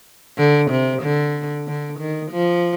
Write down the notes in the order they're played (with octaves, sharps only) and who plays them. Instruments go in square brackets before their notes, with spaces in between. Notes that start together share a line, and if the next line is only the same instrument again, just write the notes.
[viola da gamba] D3
C3
D3
D3
D#3
F3